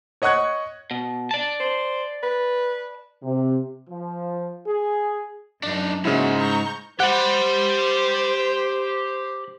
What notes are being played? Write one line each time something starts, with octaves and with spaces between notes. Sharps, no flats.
C#5 D#5 F#5 C#6 F#6 G#6
B2
D5 A5
C5
B4
C3
F3
G#4
F#2 D4 D#4
G#2 C#3 A#3 E4 F#4
A#5 C#6 G6
G4 C5 F#5 B5